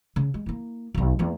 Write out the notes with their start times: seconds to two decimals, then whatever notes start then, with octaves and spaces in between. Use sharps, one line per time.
0.16 C#3
0.34 G#3
0.46 A#3 E4
0.95 D#1 B1
1.19 E2 A#3